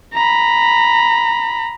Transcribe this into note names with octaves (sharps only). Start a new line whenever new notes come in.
A#5 B5